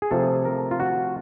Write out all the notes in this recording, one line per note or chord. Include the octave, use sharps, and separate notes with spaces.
G#4
C3 F3 A3 A4
A#4
F4
F#4